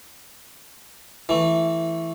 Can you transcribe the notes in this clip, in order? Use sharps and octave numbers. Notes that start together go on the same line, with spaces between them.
E3 A3